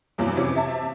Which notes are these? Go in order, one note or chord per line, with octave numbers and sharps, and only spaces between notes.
E2 G2 C3 E3 F#3
F2 C3 E3 C#4
C3 E5 A5